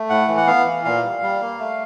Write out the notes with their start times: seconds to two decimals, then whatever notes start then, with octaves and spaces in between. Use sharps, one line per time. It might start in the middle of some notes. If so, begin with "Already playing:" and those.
Already playing: A3
0.09 A2 F#5
0.28 E3
0.37 F#5
0.47 B3 F5
0.66 E3
0.85 A#2 F5
1.04 G3
1.22 G3
1.41 A#3
1.59 A3